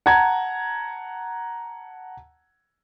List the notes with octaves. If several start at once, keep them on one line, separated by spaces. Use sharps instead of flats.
F#5 A5 A#5 G#6